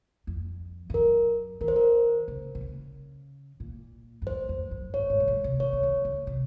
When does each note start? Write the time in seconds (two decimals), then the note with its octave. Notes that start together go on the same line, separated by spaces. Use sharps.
0.27 F2
0.90 G#2
0.94 F#2 A#4
1.61 D#3 A#4
1.68 C5
1.76 A#4
2.28 C#3
2.55 C3
2.61 C#3
3.60 A#2
4.22 F#2
4.27 G#2 C5
4.44 F#2
4.49 F2
4.71 F#2
4.94 G#2 C#5
5.10 G#2
5.20 C3
5.28 A#2
5.44 C3
5.60 C#3 C#5
5.73 C#3
5.83 D#3
6.05 C#3
6.27 C3